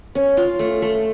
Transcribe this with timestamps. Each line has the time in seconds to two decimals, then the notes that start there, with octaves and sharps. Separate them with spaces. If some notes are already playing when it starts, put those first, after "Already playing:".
0.15 C#4
0.37 F4
0.59 A3
0.82 A3